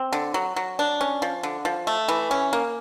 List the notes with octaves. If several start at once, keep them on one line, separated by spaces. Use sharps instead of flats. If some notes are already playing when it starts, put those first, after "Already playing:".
Already playing: C4
D3
F#3
F#3
D4
C#4
F3
D3
F3
A3
E3
C#4
A#3